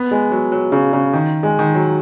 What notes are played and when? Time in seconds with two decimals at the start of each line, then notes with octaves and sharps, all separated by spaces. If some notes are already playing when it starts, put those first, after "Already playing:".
Already playing: B3
0.11 G#3
0.32 F#3
0.52 F#3
0.72 C#3
0.93 C#3
1.13 D#3
1.43 G#3
1.59 D#3
1.74 F#3